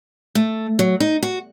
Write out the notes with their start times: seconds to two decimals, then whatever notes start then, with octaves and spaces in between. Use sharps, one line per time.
0.35 A3
0.79 F#3
1.00 D#4
1.23 F#4